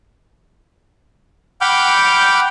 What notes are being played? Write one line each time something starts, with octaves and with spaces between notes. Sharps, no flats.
F#5 G5 B5 D6 F6 G6